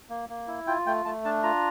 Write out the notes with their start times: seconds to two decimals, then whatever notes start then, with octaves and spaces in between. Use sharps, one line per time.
0.10 A#3
0.29 A#3
0.47 E4
0.67 F4 G5
0.86 A3 G5
1.05 A3 A5
1.25 D4 A5
1.43 F4 A#5